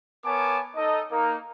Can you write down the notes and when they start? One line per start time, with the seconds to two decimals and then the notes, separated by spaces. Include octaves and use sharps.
0.25 B3 A#4 C#5 G#5 A5 D6
0.76 D#4 A4 D#5
1.10 A#3 D#4 A#4